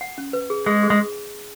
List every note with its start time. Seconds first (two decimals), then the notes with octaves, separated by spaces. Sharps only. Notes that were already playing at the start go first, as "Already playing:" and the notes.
0.01 F#5
0.18 C#4
0.33 B4
0.50 G#4
0.66 G#3 G#4
0.83 G#4
0.90 G#3